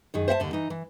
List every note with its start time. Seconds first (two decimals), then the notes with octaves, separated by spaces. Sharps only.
0.14 F#2 D#3 G#4
0.28 C5 E5 F#5 A5
0.40 D#2 D3
0.53 E3 D#4
0.70 E3